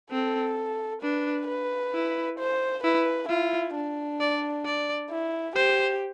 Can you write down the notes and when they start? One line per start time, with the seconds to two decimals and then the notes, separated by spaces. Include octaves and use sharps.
0.11 C4 A4
1.02 D4 B4
1.47 B4
1.94 E4
2.39 C5
2.84 E4 B4
3.29 E4 F4
3.75 D4
4.20 D5
4.65 D5
5.11 E4
5.56 G4 C5